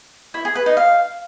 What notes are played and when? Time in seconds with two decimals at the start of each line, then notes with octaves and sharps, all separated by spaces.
0.34 E4
0.45 G#4
0.55 B4
0.66 D#4
0.77 F5